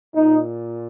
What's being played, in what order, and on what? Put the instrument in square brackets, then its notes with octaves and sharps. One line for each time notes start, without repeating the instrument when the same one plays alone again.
[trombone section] A#2 D#4